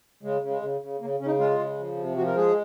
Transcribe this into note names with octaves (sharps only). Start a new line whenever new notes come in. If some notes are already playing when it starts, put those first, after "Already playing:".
C#3 G#3
C#3
G#3
C#3
C#3
C#3 A#3
C#3 C#4
D#4
G#3 F4
C#3
F3
C3
F3 F#4
A#4
G#3 G#4